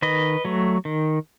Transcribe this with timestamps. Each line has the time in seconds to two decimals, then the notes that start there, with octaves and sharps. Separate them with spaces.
0.02 D#3 B4 D#5
0.45 F#3 A3
0.85 D#3